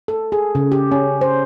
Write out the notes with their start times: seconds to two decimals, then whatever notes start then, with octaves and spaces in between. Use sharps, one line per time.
0.08 A4
0.32 G#4
0.55 C#3
0.72 G4
0.92 C#4
1.21 C5